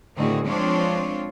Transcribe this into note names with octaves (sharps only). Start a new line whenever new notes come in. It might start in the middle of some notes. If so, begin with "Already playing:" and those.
A2 D3 D#3 C4 F#4 G#4
F3 G#3 C4 D4 F4 C#5